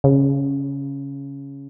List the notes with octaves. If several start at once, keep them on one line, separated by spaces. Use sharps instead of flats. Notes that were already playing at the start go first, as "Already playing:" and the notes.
C#3